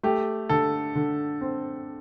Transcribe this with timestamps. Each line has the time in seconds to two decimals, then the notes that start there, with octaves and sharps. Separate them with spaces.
0.03 A3 G4
0.49 D3 A4
0.95 D3
1.41 C4